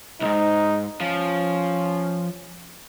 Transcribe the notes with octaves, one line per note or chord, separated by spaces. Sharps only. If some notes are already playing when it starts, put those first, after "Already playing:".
C2 G#2 D#4
F3 C#4